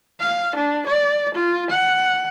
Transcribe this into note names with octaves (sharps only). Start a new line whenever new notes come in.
F5
D4
D5
F4
F#5